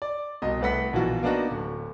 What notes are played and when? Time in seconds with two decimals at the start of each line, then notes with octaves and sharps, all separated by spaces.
0.02 D5
0.42 C2 B2 D#5
0.61 C2 A3 B4 F#5 B6
0.93 A#1 B2 E3 F4 F#4
1.23 A#3 B3 D4 D#4 F#4
1.51 D1